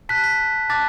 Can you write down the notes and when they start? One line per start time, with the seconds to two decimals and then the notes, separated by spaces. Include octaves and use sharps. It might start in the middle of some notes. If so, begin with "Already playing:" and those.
0.09 A5 F#6 B6
0.24 B6
0.69 A5 D6 F#6 A6